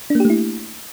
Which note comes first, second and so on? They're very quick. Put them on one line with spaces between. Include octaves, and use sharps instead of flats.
D4 A#3 G4 A3 E4